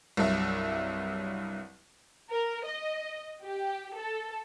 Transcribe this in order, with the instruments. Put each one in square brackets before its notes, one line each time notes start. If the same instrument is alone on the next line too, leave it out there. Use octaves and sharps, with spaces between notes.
[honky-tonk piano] C2 G2 F#3 E5
[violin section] A#4
D#5
G4
A4